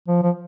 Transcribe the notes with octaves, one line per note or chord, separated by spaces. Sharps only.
F3
F3